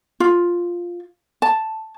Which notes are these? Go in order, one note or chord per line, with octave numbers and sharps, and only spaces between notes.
F4
A5